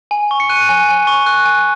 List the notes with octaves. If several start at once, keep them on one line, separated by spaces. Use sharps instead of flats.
G#5
C#6
C#7
F#6 D#7
G#5
G#5
C#6
F#6
G#5